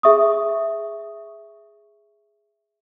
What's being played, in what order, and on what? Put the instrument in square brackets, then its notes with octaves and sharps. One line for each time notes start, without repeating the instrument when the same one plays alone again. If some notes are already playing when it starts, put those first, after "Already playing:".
[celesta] G#4 E5 C#6 D#6